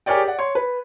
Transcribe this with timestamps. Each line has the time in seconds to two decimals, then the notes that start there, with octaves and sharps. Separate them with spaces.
0.06 G4 G#4 A#4 C#5 D5 G5
0.24 D5 F#5
0.39 C#5 C6
0.55 B4